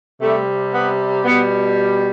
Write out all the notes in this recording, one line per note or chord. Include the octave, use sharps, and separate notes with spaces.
C3 G3 A3
B3
B2 G3 B3